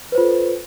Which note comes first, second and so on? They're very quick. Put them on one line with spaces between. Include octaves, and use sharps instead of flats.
B4 C5 F4 A4